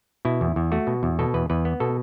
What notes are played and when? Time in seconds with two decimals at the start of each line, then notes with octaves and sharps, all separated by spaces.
0.25 B2 E4
0.41 E2
0.56 E2
0.72 A3 F#4
0.87 B2
1.03 E2
1.19 B2 A4
1.34 E2 B4
1.50 E2 B4
1.65 B3
1.80 B2 A4